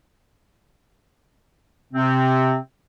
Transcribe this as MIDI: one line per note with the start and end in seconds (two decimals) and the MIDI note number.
1.93 2.56 48
1.93 2.56 60